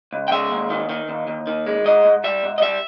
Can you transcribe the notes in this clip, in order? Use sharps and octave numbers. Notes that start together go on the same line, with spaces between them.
C#2
G5
G#3 E5
D#2
D#3
D#3
D#2
D#2
D#3
G#3
G#2 D#5
G#2
G3 E5
G#2
D#5
G3 E5